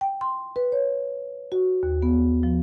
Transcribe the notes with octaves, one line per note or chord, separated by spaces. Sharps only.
G5
C6
B4
C#5
F#4
D#2
B3
F3